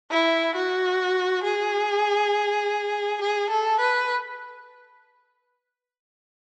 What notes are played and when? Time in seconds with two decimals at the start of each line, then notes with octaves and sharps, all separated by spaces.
0.11 E4
0.56 F#4
1.44 G#4
3.21 G#4
3.50 A4
3.80 B4